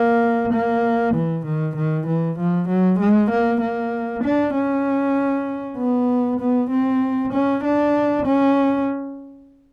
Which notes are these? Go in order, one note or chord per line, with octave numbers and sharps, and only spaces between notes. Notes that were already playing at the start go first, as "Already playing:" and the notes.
Already playing: A#3
A#3
E3
D#3
D#3
E3
F3
F#3
G#3
A#3
A#3
D4
C#4
B3
B3
C4
C#4
D4
C#4